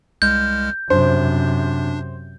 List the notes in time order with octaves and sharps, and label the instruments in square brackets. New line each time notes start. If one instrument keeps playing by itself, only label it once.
[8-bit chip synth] C2 G#3 F6 [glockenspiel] G6
[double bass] F#2 C3 [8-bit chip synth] D4 [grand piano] C5